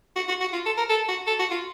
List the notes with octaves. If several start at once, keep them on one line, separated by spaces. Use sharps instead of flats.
F#4
F#4
F#4
F4
A4
A#4
A4
F#4
A4
F#4
F4